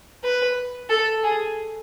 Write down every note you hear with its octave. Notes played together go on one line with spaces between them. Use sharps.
B4
A4
G#4